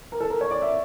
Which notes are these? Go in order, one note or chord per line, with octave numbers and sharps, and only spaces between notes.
A#4
A4
A#4
C#5
D5
E5